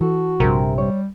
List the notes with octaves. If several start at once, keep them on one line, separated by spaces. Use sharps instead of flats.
E3 F#4 A4
A#1 G2 C3 G#4 A#4
G3 C#5